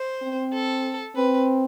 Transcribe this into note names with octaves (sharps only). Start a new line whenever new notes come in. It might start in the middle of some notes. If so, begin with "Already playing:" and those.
Already playing: C5
C4
A4
C4 B4